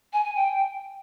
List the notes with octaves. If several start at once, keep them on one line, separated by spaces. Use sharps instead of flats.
G#5
G#5
G5